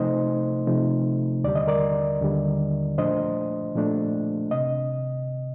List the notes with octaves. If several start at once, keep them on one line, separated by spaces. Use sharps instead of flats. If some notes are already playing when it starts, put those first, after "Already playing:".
Already playing: C3 F3 A3 D#4 C5 D#5
C3 F3 A3 D#4
D#2 D3 G3 D5
D#5
A#4 D5
D#2 D3 G3
A#2 F3 A3 D4 C5 D#5
A#2 F3 A3 D4
C3 D#5